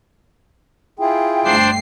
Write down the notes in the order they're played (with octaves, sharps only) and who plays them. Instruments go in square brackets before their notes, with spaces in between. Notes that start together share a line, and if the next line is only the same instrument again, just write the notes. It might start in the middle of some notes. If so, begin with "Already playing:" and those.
[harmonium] E4 F4 G#4 [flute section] G5
[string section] G1 D2 C7 [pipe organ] D4 C5 D5